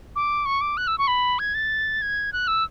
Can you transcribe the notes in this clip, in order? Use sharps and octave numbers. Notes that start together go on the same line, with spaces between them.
D6
C#6
D6
F#6
E6
C#6
B5
G#6
A6
G#6
F#6
E6